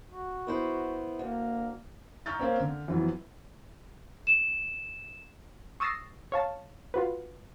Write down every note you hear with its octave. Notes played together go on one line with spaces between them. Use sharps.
F#4
B3 E4 C5
D2 A#3
A#5 C#6 E6 F6 G6 A6
A#3 C4 C#4
D3
F2 E3 F#3 B3
E7
C#6 D#6 E6 A6 A#6 C7
C#5 F5 A5
F4 F#4 B4